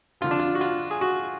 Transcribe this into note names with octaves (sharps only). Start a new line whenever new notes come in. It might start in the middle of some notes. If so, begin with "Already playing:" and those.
F2 D3 F3 F4
D4
F4
F#4
F4
G#4
F#4